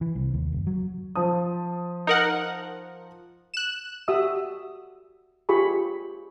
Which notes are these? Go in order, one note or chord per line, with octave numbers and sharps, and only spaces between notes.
E3
C2
D#2
F#1
F#3
F3 A5 D#6
D#4 A#4 F#5
F#6 E7
F#4 G4 E5 D#6 E6
F4 G4 G#4 B5 C#6